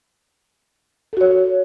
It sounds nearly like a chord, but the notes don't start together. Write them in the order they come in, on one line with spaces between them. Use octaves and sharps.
A4 F#4 C#5